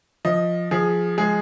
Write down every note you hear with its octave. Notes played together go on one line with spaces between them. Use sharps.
F3 D#5
F3 G#4
G#3 G#4